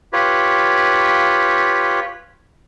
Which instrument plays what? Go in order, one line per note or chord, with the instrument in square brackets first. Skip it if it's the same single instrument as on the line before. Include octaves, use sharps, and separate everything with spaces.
[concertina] F4 G4 B4 C#5